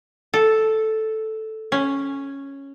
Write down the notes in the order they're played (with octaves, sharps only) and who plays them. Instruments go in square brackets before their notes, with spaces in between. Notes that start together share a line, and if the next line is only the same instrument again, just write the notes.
[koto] A4
C#4